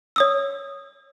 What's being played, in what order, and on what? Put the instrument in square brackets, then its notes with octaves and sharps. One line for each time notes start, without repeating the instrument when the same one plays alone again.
[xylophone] C#5 D#6 E6